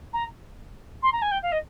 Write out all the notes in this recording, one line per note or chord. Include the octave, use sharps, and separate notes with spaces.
A#5
C6
A#5
G#5
G5
F5
D#5